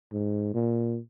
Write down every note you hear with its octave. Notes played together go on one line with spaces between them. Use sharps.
G#2
A#2